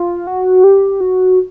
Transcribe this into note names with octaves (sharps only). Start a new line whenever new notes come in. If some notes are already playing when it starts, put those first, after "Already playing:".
Already playing: F4
F#4
G4
F#4